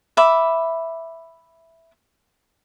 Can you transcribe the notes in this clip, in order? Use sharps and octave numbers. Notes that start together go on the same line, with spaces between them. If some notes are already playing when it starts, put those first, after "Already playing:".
E5 B5 D6